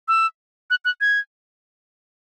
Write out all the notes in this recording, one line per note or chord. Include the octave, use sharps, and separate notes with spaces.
E6
F#6
F#6
G#6